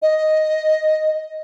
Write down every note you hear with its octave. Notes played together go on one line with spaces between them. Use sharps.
D#5